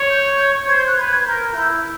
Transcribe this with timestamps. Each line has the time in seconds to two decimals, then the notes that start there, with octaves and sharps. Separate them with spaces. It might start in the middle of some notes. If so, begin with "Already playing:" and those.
Already playing: C#5
0.10 G6
0.39 G6
0.67 C5 G#6
0.77 G6
0.87 F#6
0.97 B4 G#6
1.11 G#6
1.25 A#4 G6
1.54 E4 G6